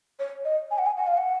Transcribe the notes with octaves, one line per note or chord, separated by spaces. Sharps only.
C#5
D#5
G#5
F#5
G#5
F#5
F5
F#5